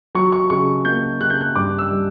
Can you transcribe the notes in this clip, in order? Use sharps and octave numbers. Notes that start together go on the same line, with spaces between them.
F#3 C#6
C#6
C#3 C#6
A#3 G6
C#3 F#6
G6
F#6
G2 D6
E6
G3